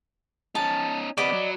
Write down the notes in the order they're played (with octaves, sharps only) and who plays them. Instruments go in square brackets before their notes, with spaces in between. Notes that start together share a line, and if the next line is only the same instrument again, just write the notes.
[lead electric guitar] C#4 D#4 [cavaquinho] A5
[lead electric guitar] C3 B3 [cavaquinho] D5 D#5 B5
[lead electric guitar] F#3